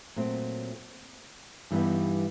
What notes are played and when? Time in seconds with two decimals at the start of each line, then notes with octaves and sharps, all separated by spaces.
0.16 A#2 F#3 A3 C4
1.71 G2 E3 G3 B3 D#4